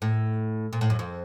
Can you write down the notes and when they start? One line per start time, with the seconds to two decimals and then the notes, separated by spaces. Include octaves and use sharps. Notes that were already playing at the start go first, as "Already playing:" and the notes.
0.02 A2
0.73 A#2
0.81 A2
0.90 F#2
0.99 F2